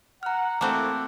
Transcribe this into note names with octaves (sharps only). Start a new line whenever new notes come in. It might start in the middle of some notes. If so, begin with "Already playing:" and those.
F#5 A#5 F6
A3 A#3 C4 E4 F#4 A4 D6 F#6